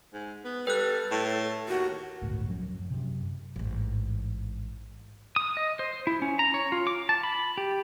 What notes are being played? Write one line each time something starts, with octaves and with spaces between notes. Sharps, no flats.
G#2
B3
G3 A4 B4 F#6
A2
D#2 F#4
G1 C#2 A2
F#2 F3 F#3 C#4
F#2 C3
A1 G#2
D#6
D#5
C5
E4
C#4
A#5
C#5
F4
D6
A5
B5
G4